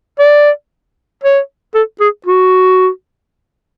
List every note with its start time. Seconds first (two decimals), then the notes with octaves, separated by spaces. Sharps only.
0.19 D5
1.24 C#5
1.75 A4
2.00 G#4
2.26 F#4